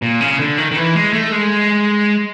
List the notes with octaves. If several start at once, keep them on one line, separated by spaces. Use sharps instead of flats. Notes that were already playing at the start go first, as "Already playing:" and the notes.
A#2
C#3
D3
D#3
D#3
E3
G#3
A3
G#3